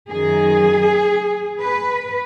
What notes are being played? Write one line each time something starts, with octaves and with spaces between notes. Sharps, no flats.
F#2 D#3 F#3 G#4
B4